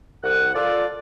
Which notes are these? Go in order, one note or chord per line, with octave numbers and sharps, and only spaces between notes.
C2 F#5
F4 A4 D5